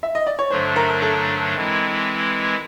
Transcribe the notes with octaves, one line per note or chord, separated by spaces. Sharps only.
E5
D#5
D5
C#5
G2 D3 F#3 A3 D4 C5
A#4
A4
E3 G#3 C4 E4